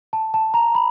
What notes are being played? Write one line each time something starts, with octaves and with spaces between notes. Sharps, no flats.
A5
A5
A#5
B5